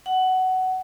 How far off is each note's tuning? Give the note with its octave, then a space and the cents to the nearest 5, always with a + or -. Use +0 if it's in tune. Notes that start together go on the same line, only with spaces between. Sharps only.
F#5 +15